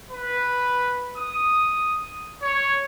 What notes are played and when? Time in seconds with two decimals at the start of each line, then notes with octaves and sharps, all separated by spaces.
0.12 B4
1.17 D#6
2.43 C#5